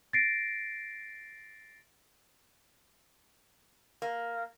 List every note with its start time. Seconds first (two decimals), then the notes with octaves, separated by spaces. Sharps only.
0.13 A6 A#6 C7 D7
4.02 A#3